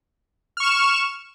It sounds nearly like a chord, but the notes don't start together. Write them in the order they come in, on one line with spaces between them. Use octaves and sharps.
F6 C#6 E7